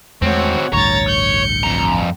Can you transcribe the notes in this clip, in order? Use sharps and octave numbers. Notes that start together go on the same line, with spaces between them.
E2 G#3 A3 C4 F#4 C#5 F#5
A1 D2 G2 C#5 A#5 A6
G6 C#7
F2 A#5